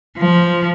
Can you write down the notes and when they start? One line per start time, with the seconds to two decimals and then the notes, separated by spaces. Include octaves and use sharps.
0.18 F3